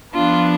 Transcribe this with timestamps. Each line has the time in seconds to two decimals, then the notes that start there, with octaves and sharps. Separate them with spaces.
0.14 F3 B3 D4 F4